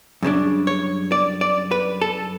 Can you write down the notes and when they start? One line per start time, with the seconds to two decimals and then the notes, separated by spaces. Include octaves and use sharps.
0.23 F#2 C#3 G3 D4
0.67 C#5
1.12 D5
1.41 D5
1.71 B4
2.02 A4